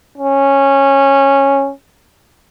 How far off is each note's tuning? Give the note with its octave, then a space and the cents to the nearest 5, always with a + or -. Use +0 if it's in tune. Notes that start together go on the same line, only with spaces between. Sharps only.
C#4 -10